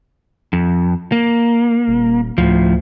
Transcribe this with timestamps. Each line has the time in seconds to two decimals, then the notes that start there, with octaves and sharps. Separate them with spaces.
0.53 F2
1.12 A#3
1.88 D#1
2.38 D2 A2 F3